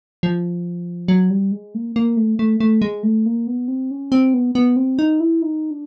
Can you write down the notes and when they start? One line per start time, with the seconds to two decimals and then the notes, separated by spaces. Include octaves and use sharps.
0.23 F3
1.08 F#3
1.30 G3
1.52 G#3
1.75 A#3
1.96 A#3
2.17 A3
2.39 A3
2.60 A3
2.82 G#3
3.03 A3
3.26 A#3
3.47 B3
3.68 C4
3.91 C#4
4.12 C4
4.34 B3
4.55 B3
4.76 C4
4.99 D#4
5.20 E4
5.42 D#4
5.71 D4